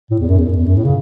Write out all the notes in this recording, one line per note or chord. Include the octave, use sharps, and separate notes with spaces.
A2
E2
F#2
E2
F#2
E2
F#2
A2
C#3